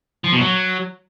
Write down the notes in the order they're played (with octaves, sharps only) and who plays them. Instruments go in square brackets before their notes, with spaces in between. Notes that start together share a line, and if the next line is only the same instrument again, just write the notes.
[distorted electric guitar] F3
B2
F#3